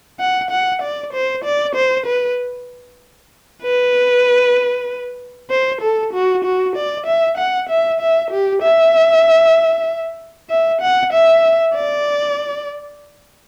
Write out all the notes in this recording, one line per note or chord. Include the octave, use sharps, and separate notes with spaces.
F#5
F#5
D5
C5
D5
C5
B4
B4
C5
A4
F#4
F#4
D5
E5
F#5
E5
E5
G4
E5
E5
F#5
E5
D5